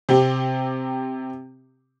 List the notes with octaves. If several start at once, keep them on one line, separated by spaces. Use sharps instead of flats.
C3 C4 G4